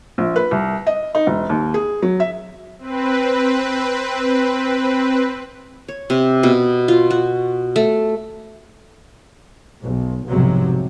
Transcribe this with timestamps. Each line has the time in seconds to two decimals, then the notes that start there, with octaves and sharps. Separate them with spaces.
0.18 A#1
0.36 B4
0.51 C2
0.87 D#5
1.15 D#4
1.27 E1
1.49 D#2
1.74 G#4
2.02 F#3
2.20 E5
2.79 C4 B4
5.89 C#5
6.10 C3
6.43 B2
6.88 F4
7.11 F#4
7.76 A3
9.81 B1
10.26 B1 F2 G#2 C3 F3 F#3